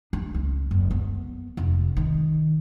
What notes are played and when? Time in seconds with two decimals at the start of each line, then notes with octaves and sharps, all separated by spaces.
0.13 D4
0.34 C#2
0.71 F#1
0.91 B3
1.57 F1
1.97 D#3